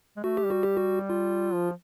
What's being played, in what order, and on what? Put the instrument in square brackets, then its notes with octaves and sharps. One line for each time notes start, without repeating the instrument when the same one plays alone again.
[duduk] G#3
[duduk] A3 [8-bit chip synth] F#4
[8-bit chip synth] G4
[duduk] G3 [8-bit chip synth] F#4
[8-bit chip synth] G4
F#4
F4
[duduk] F3